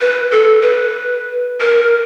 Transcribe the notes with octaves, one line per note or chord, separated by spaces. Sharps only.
B4
A4
B4
A#4